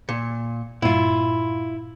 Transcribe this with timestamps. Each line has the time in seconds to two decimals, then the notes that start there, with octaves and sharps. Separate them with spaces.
0.09 A#2 C#7
0.82 G2 A#2 E4 F4